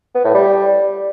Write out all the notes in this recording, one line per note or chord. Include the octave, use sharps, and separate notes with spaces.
B3
A2
G3